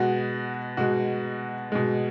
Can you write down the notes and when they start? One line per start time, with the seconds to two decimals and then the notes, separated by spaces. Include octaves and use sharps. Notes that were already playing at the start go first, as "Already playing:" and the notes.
Already playing: B2 G#3 F#4
0.77 B2 G#3 F#4
1.72 B2 G#3